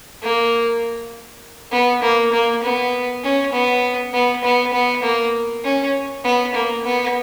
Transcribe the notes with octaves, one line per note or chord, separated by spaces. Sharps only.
A#3
B3
A#3
A#3
B3
C#4
B3
B3
B3
B3
A#3
C#4
B3
A#3
B3